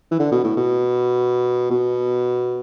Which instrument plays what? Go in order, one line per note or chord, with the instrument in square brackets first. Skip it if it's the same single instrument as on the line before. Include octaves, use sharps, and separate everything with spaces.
[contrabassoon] E3
D3
B2
A2
B2
B2